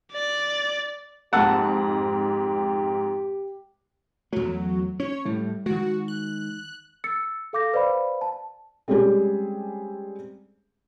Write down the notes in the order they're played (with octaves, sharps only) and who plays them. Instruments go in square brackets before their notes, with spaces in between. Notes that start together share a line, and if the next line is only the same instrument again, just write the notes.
[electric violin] D5
[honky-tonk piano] F2 G#2 [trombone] G4 [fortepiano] F#5 A5 E6
[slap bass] E2 A3 [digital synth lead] F#3
[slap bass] C#4 [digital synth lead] C#5
[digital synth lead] A2 [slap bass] G3
[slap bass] D#3 G#3 [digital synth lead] F#4
[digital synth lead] F#6
[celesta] E6 A6 C#7
A4 F5 D6 G6 A#6
B4 C5 D5 F5 B5
A5
[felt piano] G3 G#3 C4 C#4 G4 G#4